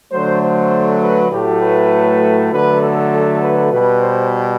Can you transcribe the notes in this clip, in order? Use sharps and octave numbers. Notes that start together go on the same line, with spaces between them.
D3 F#3 A3 C5
C5
B4
A2 F#3 A3 G4
B4
D3 F#3 A3 B4
A4
A4
B4
B2 G3 B4
C5